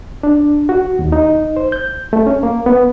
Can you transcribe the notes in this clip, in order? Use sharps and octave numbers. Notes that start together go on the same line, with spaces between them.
D4
F#4
D#2
D#4
C5
G6
A3
C#4
A#3
B3